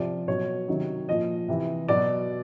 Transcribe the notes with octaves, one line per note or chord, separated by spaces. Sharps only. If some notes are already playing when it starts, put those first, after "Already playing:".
Already playing: C3 F3 D5
B2 F#3 C#5
C3 D#3 F#3
A#2 F3 D#5
C3 E3
B2 F#3 D5